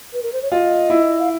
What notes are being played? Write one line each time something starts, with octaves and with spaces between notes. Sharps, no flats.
B4
A#4
C5
C#5
F4 D#5
E4
F5